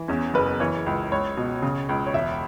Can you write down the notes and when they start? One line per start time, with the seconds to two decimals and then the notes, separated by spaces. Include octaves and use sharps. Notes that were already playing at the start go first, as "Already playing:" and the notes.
Already playing: E3
0.08 E2 C#4
0.34 F#1 B4
0.60 E3 C#5
0.86 C#2
1.11 C#2 C#5
1.37 B2
1.62 C#3
1.89 C#2
2.07 C#5
2.14 E1 E5